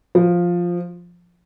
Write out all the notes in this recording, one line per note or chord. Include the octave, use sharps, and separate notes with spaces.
F3